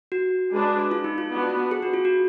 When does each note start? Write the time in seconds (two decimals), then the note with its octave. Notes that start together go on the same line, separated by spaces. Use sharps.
0.12 F#4
0.51 G#3 D4 G#4 B4
0.91 F4
1.04 D#4
1.18 F4
1.31 B3 D4 F#4
1.71 G#4
1.82 F#4
1.94 F4
2.05 F#4